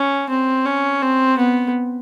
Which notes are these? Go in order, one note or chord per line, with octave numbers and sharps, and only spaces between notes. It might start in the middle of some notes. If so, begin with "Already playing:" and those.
Already playing: C#4
C4
C#4
C4
B3